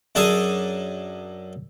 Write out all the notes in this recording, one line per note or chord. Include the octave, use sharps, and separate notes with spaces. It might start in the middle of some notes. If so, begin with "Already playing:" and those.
F#2 D4 G#4 A4 G#5 D#6